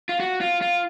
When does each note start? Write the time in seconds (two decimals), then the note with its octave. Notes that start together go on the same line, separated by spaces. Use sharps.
0.09 F4
0.20 F#4
0.41 F4
0.61 F4